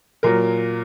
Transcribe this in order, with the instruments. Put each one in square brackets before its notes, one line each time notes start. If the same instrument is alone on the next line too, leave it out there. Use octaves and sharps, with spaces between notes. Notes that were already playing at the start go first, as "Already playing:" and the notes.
[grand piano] A#2 F#3 A#4